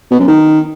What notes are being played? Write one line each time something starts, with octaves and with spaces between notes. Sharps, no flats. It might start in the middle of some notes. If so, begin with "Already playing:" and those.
B2
F#2
D#3